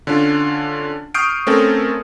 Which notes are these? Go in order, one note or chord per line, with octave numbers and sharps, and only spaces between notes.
D3 C#4 D4 F4
C#6 D#6 F6 G6 C7 D7
A3 C4 C#4 A4 A#4